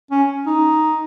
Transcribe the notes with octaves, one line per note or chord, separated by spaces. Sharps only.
C#4
D#4